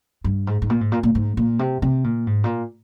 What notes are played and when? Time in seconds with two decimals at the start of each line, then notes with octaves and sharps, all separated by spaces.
0.24 G2
0.47 G#2
0.62 G#2
0.70 A#2
0.81 G#2
0.92 A#2
1.03 A#2
1.15 G#2
1.37 A#2
1.59 C3
1.82 C3
2.04 A#2
2.27 G#2
2.44 A#2